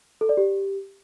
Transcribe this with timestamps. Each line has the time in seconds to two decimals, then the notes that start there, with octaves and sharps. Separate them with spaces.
0.21 A4
0.29 D5
0.37 G4